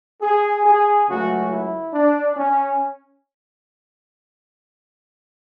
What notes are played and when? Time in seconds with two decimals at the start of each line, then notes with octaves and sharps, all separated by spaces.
0.22 G#4
0.65 G#4
1.07 C#2 C#3 F#3 A3 F#4
1.50 E4
1.94 D4
2.36 C#4